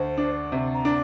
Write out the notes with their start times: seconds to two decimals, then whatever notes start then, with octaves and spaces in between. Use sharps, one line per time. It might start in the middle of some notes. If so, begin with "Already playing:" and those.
Already playing: D2 C5
0.18 D4
0.52 C3
0.74 A#5
0.85 D4